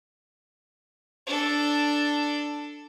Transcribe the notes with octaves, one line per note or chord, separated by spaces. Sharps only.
D4 A4